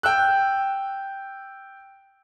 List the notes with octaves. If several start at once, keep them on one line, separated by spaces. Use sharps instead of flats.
G5 E6 F#6